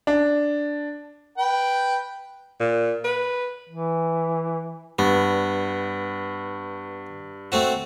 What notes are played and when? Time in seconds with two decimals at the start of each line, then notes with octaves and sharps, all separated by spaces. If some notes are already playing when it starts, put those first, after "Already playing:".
0.07 D4
1.38 B4 G5
2.60 A#2
3.04 B4
3.69 E3
4.99 G2 B3
7.52 A3 C4 F#4